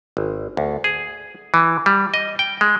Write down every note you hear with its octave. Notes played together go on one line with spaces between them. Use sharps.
G#1
D2
G#4
E3
G3
D#5
G5
G#3